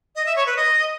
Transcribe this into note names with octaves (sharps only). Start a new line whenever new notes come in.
D#5
E5
C#5
B4
D#5